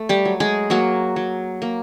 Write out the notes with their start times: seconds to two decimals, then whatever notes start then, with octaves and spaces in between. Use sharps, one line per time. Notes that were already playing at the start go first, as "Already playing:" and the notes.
Already playing: A3
0.09 G3 G4
0.25 F#3
0.40 G#3 G#4
0.70 F#3 A#3 F#4
1.16 F#3
1.62 A#3